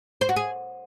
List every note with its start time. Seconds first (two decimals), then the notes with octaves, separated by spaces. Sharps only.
0.21 C5
0.29 F#4
0.36 G#4